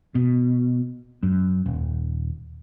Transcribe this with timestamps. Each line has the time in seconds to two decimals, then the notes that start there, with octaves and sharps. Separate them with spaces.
0.15 B2
1.23 F#2
1.66 D#1